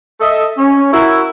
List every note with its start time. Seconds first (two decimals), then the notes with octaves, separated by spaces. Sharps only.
0.21 A4 D#5 E5
0.58 C#4
0.91 E4 F#4 A#4